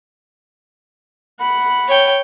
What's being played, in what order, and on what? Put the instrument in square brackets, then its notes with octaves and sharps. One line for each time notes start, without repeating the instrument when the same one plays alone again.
[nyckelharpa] F#5 B5
[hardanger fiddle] C#5 G5